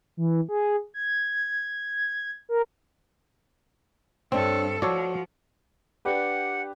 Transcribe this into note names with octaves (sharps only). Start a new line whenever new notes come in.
E3
G#4
G#6
A#4
G2 C4 D4 A4 C#5
F3 F#4 A4 C#5 D5
D4 G4 B4 F#5